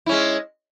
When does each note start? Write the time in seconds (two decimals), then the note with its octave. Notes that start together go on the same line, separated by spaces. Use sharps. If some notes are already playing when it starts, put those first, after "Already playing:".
0.06 E4
0.09 C#4
0.12 G#3